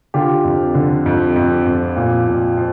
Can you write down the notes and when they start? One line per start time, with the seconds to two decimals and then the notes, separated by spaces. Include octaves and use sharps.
0.14 D3 F4 G4
0.44 F2
0.75 D3
1.06 F2
1.36 F2
1.66 F2
1.97 A#2
2.27 A#2
2.57 F3